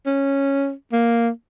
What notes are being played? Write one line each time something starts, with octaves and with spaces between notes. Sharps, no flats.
C#4
A#3